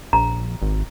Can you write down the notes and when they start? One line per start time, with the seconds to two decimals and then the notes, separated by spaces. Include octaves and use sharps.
0.13 A#1 A#5
0.62 G#1